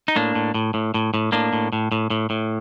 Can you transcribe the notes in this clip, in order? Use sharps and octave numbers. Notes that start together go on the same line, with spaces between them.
D#4
A2 A#3 D4
A2
A2
A2
A2
A2
A2 A#3 D4
A2
A2
A2
A2
A2